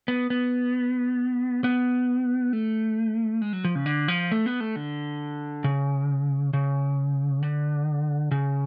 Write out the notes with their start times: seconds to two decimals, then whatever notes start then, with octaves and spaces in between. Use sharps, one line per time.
0.08 B3
0.30 B3
1.64 B3
2.53 A3
3.42 G#3
3.53 F#3
3.65 F3
3.75 C#3
3.86 D3
4.08 F3
4.32 A3
4.46 B3
4.60 A3
4.76 D3
5.64 C#3
6.53 C#3
7.43 D3
8.31 C#3